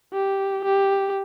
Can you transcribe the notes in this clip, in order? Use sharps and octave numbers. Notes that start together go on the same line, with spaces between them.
G4
G4